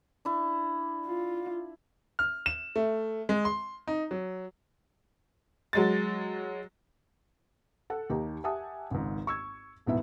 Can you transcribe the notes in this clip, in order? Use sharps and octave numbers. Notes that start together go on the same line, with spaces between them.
D4 E4
F4
F6
E7
A3
G#3
C6
D#4
F#3
F#3 G#3 A6
A4 F#5
D#2 D#4 G4
G4 E5 F#5 G#5 A5 D#6
G#1 C#2 G#2
C#6 E6 G#6
D#1 G#2 B2 B3 E4 E5